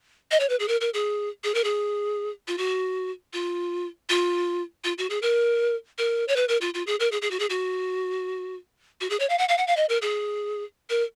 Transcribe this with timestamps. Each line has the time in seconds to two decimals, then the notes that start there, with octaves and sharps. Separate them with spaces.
0.31 D#5
0.40 C#5
0.49 B4
0.60 G#4
0.68 A#4
0.81 A#4
0.94 G#4
1.44 G#4
1.55 A#4
1.64 G#4
2.48 F4
2.58 F#4
3.33 F4
4.09 F4
4.84 F4
4.98 F#4
5.10 G#4
5.22 A#4
5.98 A#4
6.28 C#5
6.36 B4
6.49 A#4
6.61 F4
6.74 F4
6.87 G#4
7.00 A#4
7.12 G#4
7.22 G#4
7.31 F#4
7.40 G#4
7.50 F#4
9.01 F#4
9.10 G#4
9.20 C#5
9.30 F5
9.39 F#5
9.49 F5
9.58 F#5
9.67 F5
9.77 D#5
9.89 A#4
10.02 G#4
10.90 A#4